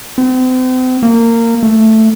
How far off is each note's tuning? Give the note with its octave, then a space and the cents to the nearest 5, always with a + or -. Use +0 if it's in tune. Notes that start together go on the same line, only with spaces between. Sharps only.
C4 -40
A#3 -20
A3 +5